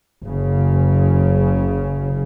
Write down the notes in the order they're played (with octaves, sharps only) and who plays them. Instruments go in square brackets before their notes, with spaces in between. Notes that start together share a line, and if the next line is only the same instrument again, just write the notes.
[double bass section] F#1 C#3